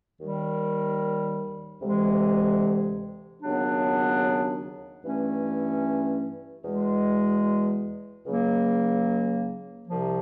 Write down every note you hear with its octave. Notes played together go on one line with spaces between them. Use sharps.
D#2 D#3 G3
D2 C3 E3 G#3
D#2 C#3 F#3 B3 D4
G2 E3 A3 C#4
E2 B2 G#3
C#2 C#3 F#3 A#3
C2 C3 F3